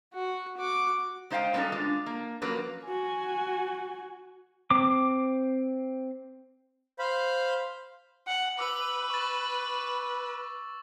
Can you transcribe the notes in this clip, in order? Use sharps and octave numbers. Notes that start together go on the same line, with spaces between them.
F#4
F#4 D6
G#3 D#4 C5 D#5 F5 G5
F#3 G3 B3 C#4 D#4 A4
G#3 D4 F4
A#3
F3 F#3 A#3 C#4 A#4 B4
F#4 G#5
C4 D6
C5 F5 B5
F#5
B4 D6 E6 F#7
C#6 A6